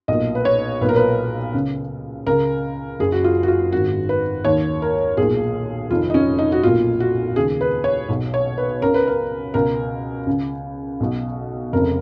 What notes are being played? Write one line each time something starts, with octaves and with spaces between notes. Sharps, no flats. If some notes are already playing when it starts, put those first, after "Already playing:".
B1 A#2 D#5
B4
C#5
B1 A#2 A#4 B4
B4
C#2 C#3
C#2 C#3 A#4
F#1 F#2 C#3 G#4
F#4
F4
F#4
F4
G#1 G#2 D#3 F#4
B4
D#2 D#3 C#5
A#4
B1 A#2 G#4
F1 F2 D#3 F4
D#4
C#4
D#4
F#4
B1 A#2 F4
F#4
D#2 C#3 G#4
B4
C#5
B1 B2
C#5
B4
C#2 C#3 A#4
B4
A#4
C#2 B2 A#4
C#2 C#3
B1 B2
F1 F2 C#3 A#4